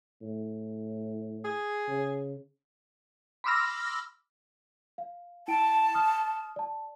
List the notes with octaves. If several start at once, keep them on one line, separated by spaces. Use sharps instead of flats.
A2
G#4
C#3
B5 C6 D6 E6 F6 A#6
F5
E4 G5 A5 D7
D#6 F6
D5 A5